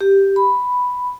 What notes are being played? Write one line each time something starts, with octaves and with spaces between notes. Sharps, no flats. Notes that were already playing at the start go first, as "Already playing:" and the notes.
G4
B5